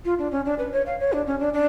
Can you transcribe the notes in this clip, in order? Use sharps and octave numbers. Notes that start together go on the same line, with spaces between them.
F4
D4
C#4
D4
B4
C#5
F5
C#5
D4
C#4
D4
D4